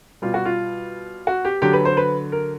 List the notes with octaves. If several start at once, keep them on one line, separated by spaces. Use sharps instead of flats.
B2 G3 F4
F#4
F4
F#4
G4
D3 F#3 G4
B4
C5
B4
A#4